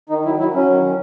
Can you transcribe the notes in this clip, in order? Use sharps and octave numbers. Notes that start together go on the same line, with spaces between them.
D#3 D#4
F#3 E4
F#3 E4
F#3 C#4
D#3
D#3